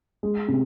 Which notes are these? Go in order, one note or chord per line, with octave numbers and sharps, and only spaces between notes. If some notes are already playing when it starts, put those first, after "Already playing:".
G#3
C3